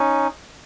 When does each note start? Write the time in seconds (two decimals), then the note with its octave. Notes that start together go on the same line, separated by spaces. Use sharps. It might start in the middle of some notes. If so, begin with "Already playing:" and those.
Already playing: C#4 D#4